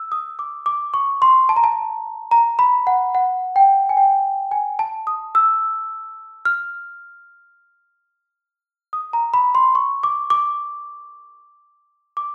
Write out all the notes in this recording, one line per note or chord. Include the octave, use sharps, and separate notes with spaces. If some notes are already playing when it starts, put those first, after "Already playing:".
Already playing: E6
D#6
D6
D6
C#6
C6
A5
A#5
A5
A#5
B5
F#5
F#5
G5
G#5
G5
G#5
A5
D#6
E6
F6
D#6
A#5
B5
C6
C#6
D6
D6
D6